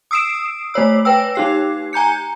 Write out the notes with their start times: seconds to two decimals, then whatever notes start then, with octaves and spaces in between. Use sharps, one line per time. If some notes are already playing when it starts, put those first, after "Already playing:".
0.11 D#6 E6 C7 D7 E7
0.74 A3 C5 C#5 E6
1.05 B4 G5 E6
1.35 D#4 G4 C7
1.93 G#5 A#5 G6 C#7